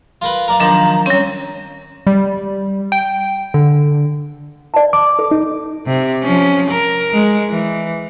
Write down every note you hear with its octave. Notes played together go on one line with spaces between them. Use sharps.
F4 A#4 B4
A#4 D5 F5 A#5
D#3 F3 F#3 D4 A#4
G3 C4 C#4 C#5
G3
G5
D3
D5 A5
D6
A4
D#4
C3
F3 C#4
A#4
G#3
E3